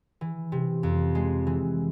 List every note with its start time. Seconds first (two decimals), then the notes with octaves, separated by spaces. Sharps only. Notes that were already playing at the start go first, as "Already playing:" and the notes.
0.21 E3
0.52 C3
0.83 F2
1.15 G#3
1.47 E3